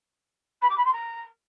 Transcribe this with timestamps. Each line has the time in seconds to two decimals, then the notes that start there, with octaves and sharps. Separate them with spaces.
0.62 B5
0.69 D6
0.77 B5
0.85 C6
0.93 A#5